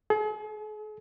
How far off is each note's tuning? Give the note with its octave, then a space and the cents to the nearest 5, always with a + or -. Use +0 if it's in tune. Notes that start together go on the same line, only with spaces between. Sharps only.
G#4 +45